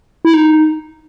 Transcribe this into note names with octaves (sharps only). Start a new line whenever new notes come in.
E4
D#4